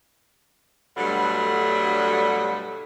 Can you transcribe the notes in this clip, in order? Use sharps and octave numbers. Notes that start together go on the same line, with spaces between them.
G2 B2 D3 F#3 G3 A3